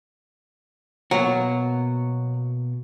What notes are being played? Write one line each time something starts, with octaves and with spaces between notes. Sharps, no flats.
B2 F#3 A#3 F#4